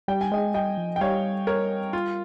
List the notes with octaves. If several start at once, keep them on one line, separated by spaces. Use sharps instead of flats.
G3 G5
G#5
G#3 D#5 G5
G3 D#5 G5
F3
G5
G3 C#5 F5
A#4 C#5
F4